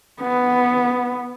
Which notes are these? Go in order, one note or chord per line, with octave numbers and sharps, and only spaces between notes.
B3